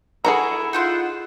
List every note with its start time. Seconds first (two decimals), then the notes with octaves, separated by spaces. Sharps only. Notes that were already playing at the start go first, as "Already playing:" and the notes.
0.25 E4 F#4 G#4 A4 A#5
0.73 D#4 F4 C5 F#5 C6